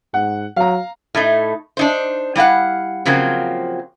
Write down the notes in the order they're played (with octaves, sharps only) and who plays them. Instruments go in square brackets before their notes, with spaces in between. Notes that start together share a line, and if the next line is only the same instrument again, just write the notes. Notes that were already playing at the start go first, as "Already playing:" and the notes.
[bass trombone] G#2 [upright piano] F#5
[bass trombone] F#3 [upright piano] F5 A#5
[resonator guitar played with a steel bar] A2 A3 D#4
D4 D#4 C5
G3 E4 F5 F#5
C#3 F3 F#3 A#3 C4